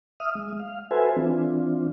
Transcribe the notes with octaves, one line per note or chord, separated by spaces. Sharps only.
E5 D#6 F6
G#3
F5
F#4 A4 B4 C5 E5 G#5
E3 C4 D4 F4